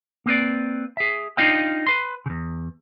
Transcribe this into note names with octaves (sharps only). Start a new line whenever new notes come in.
A#3 C4 B4 D5
G#4 E5
D4 D#4 F4 D#5 F5 G5
B4 C6
E2 C#3